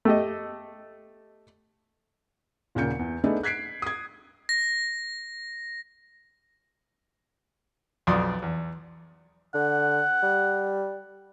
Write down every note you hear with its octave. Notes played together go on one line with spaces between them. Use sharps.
A3 G4 D#5
D#1 A#2 C#3 A#3 G6 C#7
E2
A3 B3 D4 D#4 G#4
F#6 G#6 B6 C7 D7
D#6 G#6
A#6
B1 F2 D5 C6 D6 D#6
E2
D3 F#5
G3